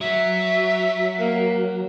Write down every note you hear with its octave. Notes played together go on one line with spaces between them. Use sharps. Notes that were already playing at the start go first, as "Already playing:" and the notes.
F#3 E5
A#3